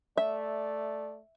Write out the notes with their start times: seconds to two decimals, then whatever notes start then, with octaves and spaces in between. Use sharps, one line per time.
0.17 A3 D5 E5